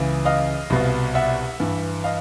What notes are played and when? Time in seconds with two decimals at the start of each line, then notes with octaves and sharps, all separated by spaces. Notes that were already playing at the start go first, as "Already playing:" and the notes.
Already playing: C#2 C#3 E3
0.25 D#5 F5
0.70 C2 B2
1.15 E5 F#5
1.60 G2 E3
2.04 D#5 F5